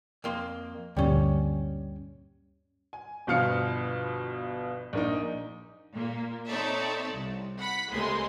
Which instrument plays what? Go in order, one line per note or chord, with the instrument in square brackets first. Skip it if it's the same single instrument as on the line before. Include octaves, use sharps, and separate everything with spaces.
[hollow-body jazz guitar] F2 A#3 C6
[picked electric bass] D2 G2 A#2 [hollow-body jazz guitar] G3 C#4
[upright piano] G#5
G1 B2 F3 F5 F6 C#7
A#1 A#3 D#4
[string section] A#2 A#3
C4 D#4 A4 C#5 D5 E5
C2
F#5 B5 B6
C#2 A2 C3 G#3 A#3 C6